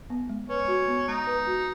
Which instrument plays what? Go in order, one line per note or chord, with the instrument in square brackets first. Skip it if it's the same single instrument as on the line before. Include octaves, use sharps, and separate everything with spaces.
[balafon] B3
G#3
[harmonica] C#4 [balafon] B4
[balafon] F#4
B3
[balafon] G#3 [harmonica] D#4
[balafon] B4
F#4